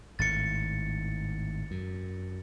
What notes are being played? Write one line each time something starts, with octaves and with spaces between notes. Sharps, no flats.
G#1 A2 A6 C#7
F#2